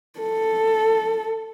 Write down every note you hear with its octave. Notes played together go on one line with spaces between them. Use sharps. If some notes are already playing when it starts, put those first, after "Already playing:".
A4